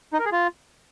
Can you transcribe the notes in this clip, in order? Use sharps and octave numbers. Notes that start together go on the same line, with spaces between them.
D#4
A#4
G#4
F4